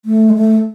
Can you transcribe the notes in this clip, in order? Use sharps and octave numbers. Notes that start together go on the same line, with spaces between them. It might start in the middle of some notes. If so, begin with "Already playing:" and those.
A3
G#3
A3